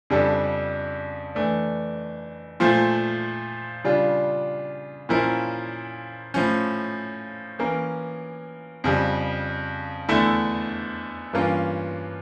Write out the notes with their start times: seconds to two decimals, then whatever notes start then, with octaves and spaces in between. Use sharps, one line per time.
0.10 F2 C#3 G3 D4 A4
1.35 E3 A3 D4
2.60 A#2 F3 A3
3.84 C#3 G3 D4 F4
5.09 A#2 F3 C#4 E4 A#4
6.34 A2 F3 C#4
7.59 E3 A#3 C#4
8.84 F2 C#3 G3
10.09 E2 D3 A3 E4
11.33 G2 E3 A#3 C#4 F4